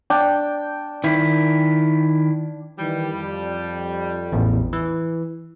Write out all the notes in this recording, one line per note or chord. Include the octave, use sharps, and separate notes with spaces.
D4 G5
D#3 E4
D#3 E3 G3
F2
A1 E2
E3